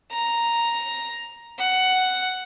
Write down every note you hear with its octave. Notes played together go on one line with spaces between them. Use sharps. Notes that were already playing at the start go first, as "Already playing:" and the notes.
A#5
F#5